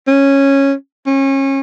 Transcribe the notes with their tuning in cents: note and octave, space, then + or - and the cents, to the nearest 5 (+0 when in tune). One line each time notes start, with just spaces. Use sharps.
C#4 -10
C#4 -30